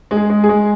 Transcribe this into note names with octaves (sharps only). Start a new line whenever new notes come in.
G#3
G#4
G#3
G#4
G#3